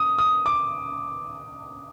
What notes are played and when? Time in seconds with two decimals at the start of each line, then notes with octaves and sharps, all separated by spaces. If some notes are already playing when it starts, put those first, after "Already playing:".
Already playing: D#6
0.18 D#6
0.46 D6